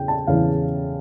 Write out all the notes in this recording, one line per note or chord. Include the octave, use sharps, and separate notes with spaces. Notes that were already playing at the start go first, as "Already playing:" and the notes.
Already playing: E2 C#3 E3 G5
A5
E2 C#3 E3 F5